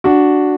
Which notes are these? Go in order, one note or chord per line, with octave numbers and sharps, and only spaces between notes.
D4 F#4